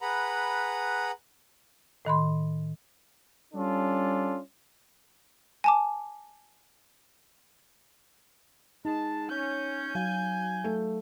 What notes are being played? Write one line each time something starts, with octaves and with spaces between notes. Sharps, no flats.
G#4 B4 F#5 A#5 B5
A2 D#3 B5 C6
G3 C#4 D4 F4 A4
G#5 A5 D6
G#3 D#4 A5
C#4 G6
F#3 F5 G#5
A3